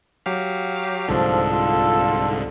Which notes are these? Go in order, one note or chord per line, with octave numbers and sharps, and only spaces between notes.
F#3 G4 F5
C2 G#2 D3 F3 A4
F4